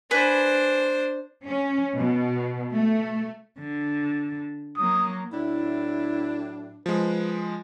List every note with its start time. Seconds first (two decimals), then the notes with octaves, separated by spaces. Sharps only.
0.11 D4 B4 C5 G#5 B5
1.47 C#4
1.97 B2
2.74 A3
3.59 D3
4.77 F#3 A#3 D#6
5.32 A2 F#3 D4 E4
6.86 F3 G#3 B4